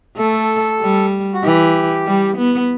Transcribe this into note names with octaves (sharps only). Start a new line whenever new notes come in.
A3 A4
G3
F#4
E3 G4
G3
B3